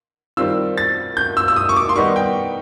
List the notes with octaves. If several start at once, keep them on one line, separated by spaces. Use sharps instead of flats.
D#3 G3 C4 F4 E6
A6
G6
E6
E6
D#6
C#6
D6
C6
D#3 G3 B3 D#4 C#6
G5